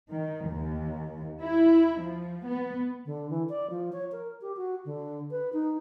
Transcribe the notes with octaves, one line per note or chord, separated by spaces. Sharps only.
D#3
D#2
E4
F3
B3
D3
E3
D5
F3
C#5
A#4
G4
F#4
D3
B4
D#4